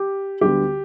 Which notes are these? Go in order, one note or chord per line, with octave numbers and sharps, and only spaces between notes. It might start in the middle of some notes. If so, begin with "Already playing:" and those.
Already playing: G4
D2 D3 G3 B3 G4